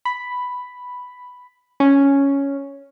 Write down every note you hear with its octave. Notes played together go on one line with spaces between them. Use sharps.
B5
C#4